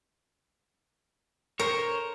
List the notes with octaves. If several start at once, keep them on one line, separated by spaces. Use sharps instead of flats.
A#4 C5 C#5